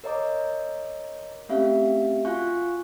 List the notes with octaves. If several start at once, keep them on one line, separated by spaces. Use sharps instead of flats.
A#4 C#5 D#5 A#5 D6
A3 C4 C#4 G4 E5 F5
F4 F#4 F5 G#5 C#6 F#6